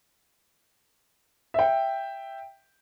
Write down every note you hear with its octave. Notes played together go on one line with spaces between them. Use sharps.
E5 G5